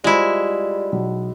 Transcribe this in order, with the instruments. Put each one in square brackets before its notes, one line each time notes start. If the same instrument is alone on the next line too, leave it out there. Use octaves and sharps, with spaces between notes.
[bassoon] G3 [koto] G#3 E4 [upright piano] F4 C5
[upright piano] B1